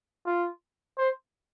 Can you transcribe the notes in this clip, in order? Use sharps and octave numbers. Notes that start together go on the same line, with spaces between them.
F4
C5